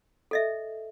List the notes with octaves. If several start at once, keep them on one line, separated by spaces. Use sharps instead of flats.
A4 D#5 E5